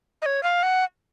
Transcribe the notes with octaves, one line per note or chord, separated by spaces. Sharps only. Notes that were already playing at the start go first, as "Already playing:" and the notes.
D#5
C#5
F5
F#5